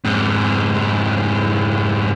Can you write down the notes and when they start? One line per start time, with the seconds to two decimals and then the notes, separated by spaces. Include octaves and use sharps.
0.05 F2 G#2